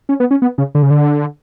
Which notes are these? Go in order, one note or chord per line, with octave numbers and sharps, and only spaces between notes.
C#4
B3
C#4
B3
C#3
D3
C#3
D3